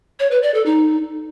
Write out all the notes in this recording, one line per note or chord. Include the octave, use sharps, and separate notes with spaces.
C#5
B4
D5
A4
D#4